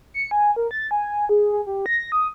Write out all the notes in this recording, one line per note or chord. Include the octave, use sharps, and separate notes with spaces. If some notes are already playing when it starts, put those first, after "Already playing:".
C#7
G#5
A#4
A6
G#5
G#4
G#4
G4
A#6
D#6